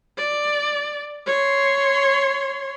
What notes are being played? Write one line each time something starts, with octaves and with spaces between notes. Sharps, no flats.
D5
C#5 C6